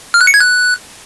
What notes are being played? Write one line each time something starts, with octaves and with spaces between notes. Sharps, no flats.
F6
F#6
C#7
G#6
F#6